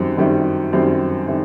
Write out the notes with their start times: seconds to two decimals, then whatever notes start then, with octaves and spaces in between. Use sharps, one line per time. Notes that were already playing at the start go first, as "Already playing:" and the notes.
Already playing: F#2 D#3 G3 C4
0.17 F#2 D#3 G3 C4 E4
0.73 F#2 D#3 G3 C4 E4
1.27 D#3 G3 C4 E4